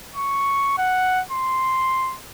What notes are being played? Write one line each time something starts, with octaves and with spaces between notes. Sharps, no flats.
C#6
F#5
C6